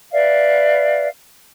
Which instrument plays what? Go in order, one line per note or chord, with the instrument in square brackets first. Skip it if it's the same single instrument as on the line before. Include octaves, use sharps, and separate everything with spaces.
[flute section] B4 D5 E5 F5